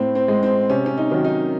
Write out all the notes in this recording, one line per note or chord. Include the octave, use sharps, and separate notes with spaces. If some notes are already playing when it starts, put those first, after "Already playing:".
Already playing: A2 C4
C4
G#3
C4
C3 C#4
C#4
D#4
D#3 F#3
D#4